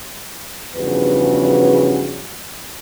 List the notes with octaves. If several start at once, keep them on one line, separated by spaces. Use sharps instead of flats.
E2 G2 C#3 F3 F#4 B4